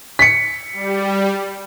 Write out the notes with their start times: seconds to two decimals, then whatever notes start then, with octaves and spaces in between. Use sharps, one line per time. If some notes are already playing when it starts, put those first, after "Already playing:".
0.19 B6 C#7
0.73 G3